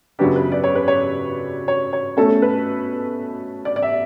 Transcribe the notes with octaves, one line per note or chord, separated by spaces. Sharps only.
F#2 C#3 F#3 B3 D4 G4
B4
D5
C#5
B4
C#5
C#5
C#5
B2 A3 C#4 A4
B4
D5
D5
E5